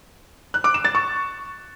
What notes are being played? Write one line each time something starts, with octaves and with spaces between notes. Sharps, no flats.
F#6
D6
E7
A6
C#6